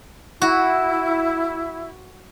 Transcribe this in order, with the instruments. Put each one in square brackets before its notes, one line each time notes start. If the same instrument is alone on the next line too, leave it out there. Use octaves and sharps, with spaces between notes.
[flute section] E4 [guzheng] F#4